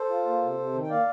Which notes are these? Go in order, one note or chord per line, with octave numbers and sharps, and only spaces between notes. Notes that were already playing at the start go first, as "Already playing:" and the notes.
Already playing: A4 C5
F4
A#3
C3
C3
D#3
G5
A#3 D5 F5